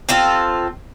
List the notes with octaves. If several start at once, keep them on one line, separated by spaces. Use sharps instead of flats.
C4 F4 A4